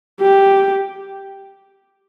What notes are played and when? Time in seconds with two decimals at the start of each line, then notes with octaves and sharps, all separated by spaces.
0.21 G4